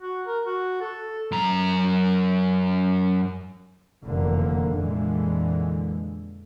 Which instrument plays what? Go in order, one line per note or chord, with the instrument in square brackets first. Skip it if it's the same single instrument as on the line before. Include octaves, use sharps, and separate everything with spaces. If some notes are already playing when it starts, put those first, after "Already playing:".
[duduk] F#4
A#4
F#4
A4
[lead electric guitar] F#2 A#5
[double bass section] F1 F#2 A#2 D3 E3 A#3
F2 A#2 D3 E3 G#3